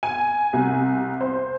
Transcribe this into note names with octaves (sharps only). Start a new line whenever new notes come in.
G#5
C2
C5